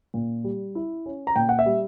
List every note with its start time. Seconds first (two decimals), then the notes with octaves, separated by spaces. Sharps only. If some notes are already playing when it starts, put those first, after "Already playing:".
0.14 A#2
0.44 G3
0.75 E4
1.06 C#4
1.27 A#5
1.36 A#2 G5
1.49 F#5
1.59 E5
1.66 G3